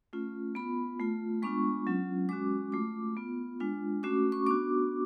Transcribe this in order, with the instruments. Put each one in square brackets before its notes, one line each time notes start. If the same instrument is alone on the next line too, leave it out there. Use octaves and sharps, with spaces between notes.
[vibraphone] A3 C#4 F4
B3 F4 B5
A3 F4
G#3 B3 D4 F4 C#6
F#3 C#4 F4
G#3 C#4 F#4 D6
A3 F4 D6
B3 F4
G#3 D4 F4
A3 C#4 F#4 D6
C#6
B3 D4 F#4 D6